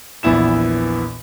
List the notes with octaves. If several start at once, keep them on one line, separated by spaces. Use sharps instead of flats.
A#1 E2 B3 E4 E7